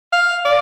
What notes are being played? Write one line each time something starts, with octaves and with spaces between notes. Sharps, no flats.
F5
D5